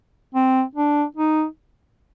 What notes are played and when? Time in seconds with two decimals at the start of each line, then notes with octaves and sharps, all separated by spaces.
0.34 C4
0.75 D4
1.16 D#4